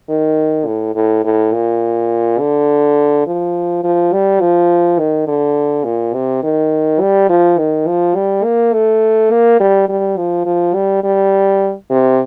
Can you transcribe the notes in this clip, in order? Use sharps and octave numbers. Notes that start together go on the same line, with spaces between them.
D#3
A2
A2
A2
A#2
D3
F3
F3
G3
F3
D#3
D3
A#2
C3
D#3
G3
F3
D#3
F3
G3
A#3
A3
A#3
G3
G3
F3
F3
G3
G3
C3